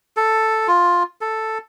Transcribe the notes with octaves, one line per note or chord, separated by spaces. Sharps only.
A4
F4
A4